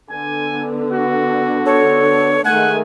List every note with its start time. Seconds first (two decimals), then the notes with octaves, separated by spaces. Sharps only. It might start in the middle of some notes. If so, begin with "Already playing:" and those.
0.10 D3 B3 G#5
0.92 F#4
1.66 A4 C#5
2.45 D#3 G#3 A3 F#5 G#5 F#6